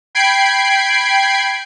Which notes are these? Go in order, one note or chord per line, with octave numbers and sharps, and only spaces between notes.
G5 B5 G#6 C7 D7